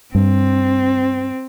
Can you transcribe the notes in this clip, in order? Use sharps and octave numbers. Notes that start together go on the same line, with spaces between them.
G2 C4